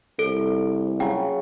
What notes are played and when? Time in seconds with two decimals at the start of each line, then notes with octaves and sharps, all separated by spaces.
0.19 C2 A4
1.00 C#3 F#3 G5